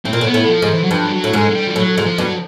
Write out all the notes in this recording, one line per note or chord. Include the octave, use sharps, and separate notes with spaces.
A2 C4
A#2
A2
B3
A2
E3
F3
G#2
E3
F#3
G2 F3
G3
F#3
A2
G#2 G#3
G#3
G3
F3
A2 F#3
G#2 F#3
F3
G2 F#3